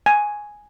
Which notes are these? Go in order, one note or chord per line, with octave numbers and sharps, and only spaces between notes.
G#5